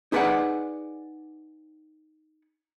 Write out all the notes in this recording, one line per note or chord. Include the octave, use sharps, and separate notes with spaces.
D#4 G#4 B4 C#5 D5 F#5